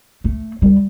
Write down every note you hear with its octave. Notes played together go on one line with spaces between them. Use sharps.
A3
G3